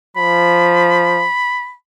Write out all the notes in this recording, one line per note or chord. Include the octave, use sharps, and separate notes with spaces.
F3 B5